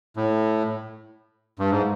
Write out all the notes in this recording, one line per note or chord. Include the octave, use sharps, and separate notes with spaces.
A2
G2
G#2